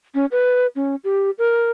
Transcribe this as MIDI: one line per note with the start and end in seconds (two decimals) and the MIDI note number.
0.15 0.26 61
0.32 0.67 71
0.76 0.96 61
1.04 1.31 67
1.38 1.71 70